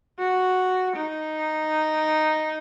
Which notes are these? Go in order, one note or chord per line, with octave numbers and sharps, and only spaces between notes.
F#4
D#4